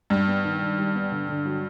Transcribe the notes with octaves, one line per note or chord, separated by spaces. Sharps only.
G2 G3
B3
D#3
D#3
G3
B3
D3
D3
F#3